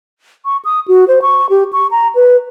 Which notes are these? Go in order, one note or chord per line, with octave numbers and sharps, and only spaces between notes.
C#6
D#6
F#4
C5
C#6
G4
C#6
A#5
B4